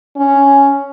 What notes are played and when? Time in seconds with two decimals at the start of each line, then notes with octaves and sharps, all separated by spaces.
0.17 C#4